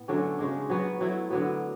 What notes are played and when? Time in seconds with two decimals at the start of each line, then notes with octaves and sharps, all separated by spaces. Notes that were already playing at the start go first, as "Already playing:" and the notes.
Already playing: A2 B3
0.08 D3 F#3 A3 C#4
0.38 C#3 G#3 D4
0.70 F#3 B3 F#4
1.00 F#3 A3 E4
1.31 D3 F#3 B3